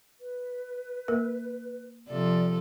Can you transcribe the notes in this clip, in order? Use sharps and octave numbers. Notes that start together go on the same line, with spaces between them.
B4
A#3 A#4
C3 F3 A4 D5